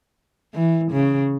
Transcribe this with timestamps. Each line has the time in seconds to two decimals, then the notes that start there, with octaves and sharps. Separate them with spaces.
0.54 E3
0.91 C#3